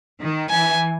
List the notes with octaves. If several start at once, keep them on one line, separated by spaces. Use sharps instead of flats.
D#3
E3 G#5